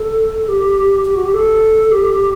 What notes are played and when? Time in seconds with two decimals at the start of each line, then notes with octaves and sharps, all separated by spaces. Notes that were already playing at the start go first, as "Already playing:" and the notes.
Already playing: A4
0.48 G4
1.05 G4
1.15 F#4
1.25 G4
1.34 A4
1.91 G4